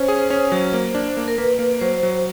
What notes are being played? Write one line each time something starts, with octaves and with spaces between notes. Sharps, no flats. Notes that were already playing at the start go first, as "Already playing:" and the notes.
Already playing: C#4 C5
G#4
C#4
F#3
A#3
D4
A#3
A#4
A#3 B4
A#3
F#3 C5
F#3